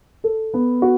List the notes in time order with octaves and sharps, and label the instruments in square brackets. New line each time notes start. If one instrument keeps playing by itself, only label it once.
[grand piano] A4
B3
F#4